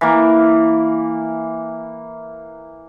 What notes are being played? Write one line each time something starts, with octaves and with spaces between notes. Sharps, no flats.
E3 A#3